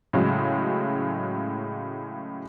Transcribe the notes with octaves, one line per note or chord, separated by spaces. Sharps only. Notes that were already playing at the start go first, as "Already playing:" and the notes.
A2 C#3 F#3 G#3